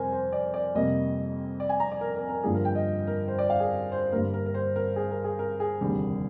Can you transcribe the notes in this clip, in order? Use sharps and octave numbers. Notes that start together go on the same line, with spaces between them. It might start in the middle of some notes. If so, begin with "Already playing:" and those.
Already playing: F2 C3 G3 A#4 C5 G#5
C5
D5
D5
F2 C3 G3 A#3 D#5
D5
G#5
A#5
D5
A#4
A#4
A#4
G2 D3 F3 A#3 G#4
A#4
G5
D#5
A#4
C5
D5
F5
G#4
C5
G2 D3 G3 A#3 A#4
A#4
A#4
C5
A#4
G#4
A#4
G#4
A#4
G#4
F1 D#2 D3 G3 A#3